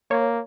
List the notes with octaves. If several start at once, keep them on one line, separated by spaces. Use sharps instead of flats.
A#3 C#5